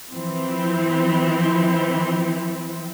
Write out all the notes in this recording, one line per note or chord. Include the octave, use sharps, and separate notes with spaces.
E3 F3 C4